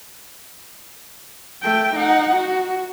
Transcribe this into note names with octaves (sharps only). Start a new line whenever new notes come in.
A3 G5
D#4 F#5
F#4